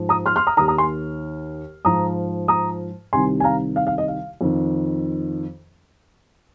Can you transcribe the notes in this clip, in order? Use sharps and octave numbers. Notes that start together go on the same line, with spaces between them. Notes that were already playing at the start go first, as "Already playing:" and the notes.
Already playing: G#2 F3
A#5 D#6
C6 F6
C6 F6
A#5 D#6
D#2 D#3 A#5 D#6
A#5 D#6
G#5 C6
G#2 F3 A#5 D#6
A#5 D#6
C2 C3 D#3 G#5 C6
G#5
F5 A#5
F5
F5
D#5
F5
F2 D#3